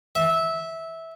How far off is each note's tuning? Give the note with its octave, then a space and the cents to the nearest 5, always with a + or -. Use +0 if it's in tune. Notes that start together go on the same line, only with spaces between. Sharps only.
E5 -15